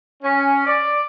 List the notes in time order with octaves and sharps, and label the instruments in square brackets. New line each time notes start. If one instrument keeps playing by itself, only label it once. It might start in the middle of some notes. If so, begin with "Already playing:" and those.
[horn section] C#4
D5